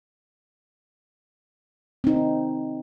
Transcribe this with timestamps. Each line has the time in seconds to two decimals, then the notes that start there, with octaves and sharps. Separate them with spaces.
2.04 C4 D#4